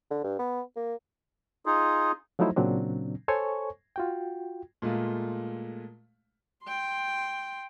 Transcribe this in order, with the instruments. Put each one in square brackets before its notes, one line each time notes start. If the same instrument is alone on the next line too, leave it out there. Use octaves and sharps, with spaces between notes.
[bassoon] D3
G2
B3
A#3
[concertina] D#4 F4 G#4
[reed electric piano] F3 F#3 A3 D#4 E4 C5
A#2 C#3 F#3 C4 D4
A4 C5 C#5 G#5 C#6
F4 F#4 G5
[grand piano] A#2 G#3 A3 F4
[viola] G5 C6